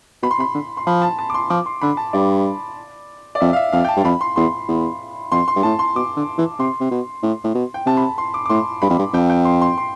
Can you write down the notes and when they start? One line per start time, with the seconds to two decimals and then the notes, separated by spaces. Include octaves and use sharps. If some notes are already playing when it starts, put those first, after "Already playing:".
0.22 B2 B5
0.31 C6
0.38 C3 B5
0.55 D3
0.77 C6
0.86 F3 B5
1.02 A5
1.19 A5
1.30 D6
1.34 C6
1.50 F3 D6
1.66 C6
1.82 D3 B5
1.97 A5
2.13 G2 D5
3.35 D5
3.40 F2 E5
3.53 F5
3.56 E5
3.72 F2 F5
3.84 G5
3.88 A5
3.97 G2
4.04 F2 B5
4.21 C6
4.36 E2 C6
4.68 E2
5.32 F2 C6
5.48 C6
5.56 G2
5.63 A2 A5
5.79 C6
5.96 B2 D6
6.16 D3
6.38 E3
6.59 C3 C6
6.81 C3
6.91 B2
7.23 A2
7.44 A2
7.55 B2
7.74 G5
7.86 C3 A5
7.97 B5
8.02 A5
8.18 C6
8.34 D6
8.46 D6
8.50 A2 C6
8.82 G2 B5
8.90 F2
8.99 G2
9.13 F2 G5
9.30 G5
9.45 C6
9.61 C6
9.78 C6